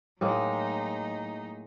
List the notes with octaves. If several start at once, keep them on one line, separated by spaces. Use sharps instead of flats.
A2 F#3 G#3 A#3 D#4